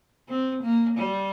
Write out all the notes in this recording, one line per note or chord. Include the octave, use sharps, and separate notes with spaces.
C4
A#3
G3